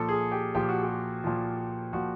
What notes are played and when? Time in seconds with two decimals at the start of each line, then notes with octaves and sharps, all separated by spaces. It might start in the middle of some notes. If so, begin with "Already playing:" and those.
Already playing: A#2 F3 A4
0.09 G#4
0.32 G4
0.55 A#2 F3 G4
0.69 F#4
0.83 G4
1.24 A#2 F3
1.93 A#2 F3 F#4